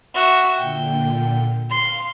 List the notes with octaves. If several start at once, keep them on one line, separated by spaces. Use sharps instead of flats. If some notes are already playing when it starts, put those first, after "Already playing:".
F#4 E5
A#2 D3 G5
F5 C6